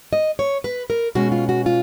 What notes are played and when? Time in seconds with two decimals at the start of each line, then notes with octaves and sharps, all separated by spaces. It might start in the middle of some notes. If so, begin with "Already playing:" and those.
0.13 D#5
0.39 C#5
0.64 B4
0.90 A#4
1.15 B2 G#3 C#4 F#4
1.32 F4
1.49 F#4
1.66 F4